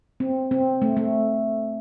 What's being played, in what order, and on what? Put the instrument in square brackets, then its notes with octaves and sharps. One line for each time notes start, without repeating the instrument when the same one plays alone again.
[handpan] C4
C4
A3
A3